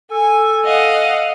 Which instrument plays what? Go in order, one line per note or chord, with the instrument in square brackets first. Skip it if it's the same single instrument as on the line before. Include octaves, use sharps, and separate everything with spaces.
[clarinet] A4 [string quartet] G#5
[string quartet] D#5 F5 F#5